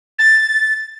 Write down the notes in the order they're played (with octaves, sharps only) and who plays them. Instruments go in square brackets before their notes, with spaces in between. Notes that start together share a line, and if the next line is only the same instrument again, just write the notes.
[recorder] A6